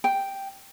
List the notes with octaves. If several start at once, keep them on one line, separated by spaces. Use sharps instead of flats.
G5